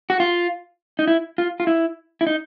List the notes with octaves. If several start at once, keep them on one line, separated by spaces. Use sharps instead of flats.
F#4
F4
D#4
E4
F4
F4
E4
E4
D#4